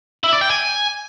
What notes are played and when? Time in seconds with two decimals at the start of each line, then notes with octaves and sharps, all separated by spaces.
0.24 E4
0.32 D5
0.41 G5
0.50 G#5